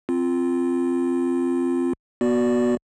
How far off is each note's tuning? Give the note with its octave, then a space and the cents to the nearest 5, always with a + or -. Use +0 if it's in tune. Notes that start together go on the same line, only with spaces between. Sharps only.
C4 +0 F4 -10
B3 -25 F#4 +0 D5 +0